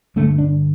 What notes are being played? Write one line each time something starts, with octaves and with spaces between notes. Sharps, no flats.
G2 D3 A3
D4